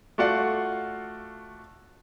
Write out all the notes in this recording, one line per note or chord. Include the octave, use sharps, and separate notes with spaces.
A3 F4 F#4 D5 F5 F#5